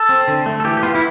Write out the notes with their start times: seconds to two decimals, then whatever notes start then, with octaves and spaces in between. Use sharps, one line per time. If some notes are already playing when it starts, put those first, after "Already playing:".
Already playing: A4
0.09 C4
0.28 D3
0.46 A3
0.60 A4
0.64 E3 G4
0.77 G4
0.83 B3 F4
0.95 E4